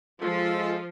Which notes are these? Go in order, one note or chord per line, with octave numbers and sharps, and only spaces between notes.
F3 G#3 F4 A4